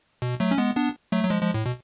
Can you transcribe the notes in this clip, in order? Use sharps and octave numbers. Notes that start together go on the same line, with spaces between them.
B2
F#3 A3
C#4
G#3 B3
B3 D4
F#3 A3
F#3
F3 G#3
F3 G#3
A2
B2